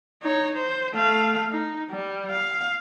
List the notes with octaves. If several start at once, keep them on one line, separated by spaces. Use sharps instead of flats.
D#4 C#5
C5
A3 F5
D#4
G3
F5